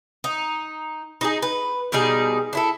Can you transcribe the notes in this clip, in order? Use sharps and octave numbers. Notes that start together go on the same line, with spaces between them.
D#4
D#4 F#4 G#4
B4
B2 G3 D#4 G#4
D4 E4 A4